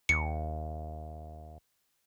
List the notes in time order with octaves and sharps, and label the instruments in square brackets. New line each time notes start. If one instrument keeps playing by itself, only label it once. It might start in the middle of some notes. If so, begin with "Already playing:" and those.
[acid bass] D#2 [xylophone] C#7